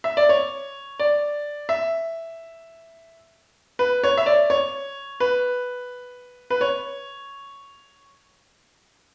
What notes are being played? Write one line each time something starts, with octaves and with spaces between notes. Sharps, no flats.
E5
D5
C#5
D5
E5
B4
C#5
E5
D5
C#5
B4
B4
C#5